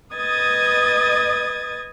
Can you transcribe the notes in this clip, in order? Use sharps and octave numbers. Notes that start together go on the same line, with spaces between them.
B4 D#5 D#6 G#6 A6